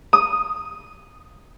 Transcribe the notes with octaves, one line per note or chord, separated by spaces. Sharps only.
D#6